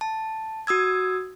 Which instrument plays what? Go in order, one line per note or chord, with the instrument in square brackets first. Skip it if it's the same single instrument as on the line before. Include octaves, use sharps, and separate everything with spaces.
[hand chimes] A5
F#4 D#6 E6 G#6